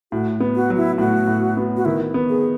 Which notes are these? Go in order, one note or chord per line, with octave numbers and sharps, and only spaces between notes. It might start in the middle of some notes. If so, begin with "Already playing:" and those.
A2 F#4
B3
F#4
F#3
E4
A2 F#4
A2
B3
F#4
D#3 E4
B3
G#4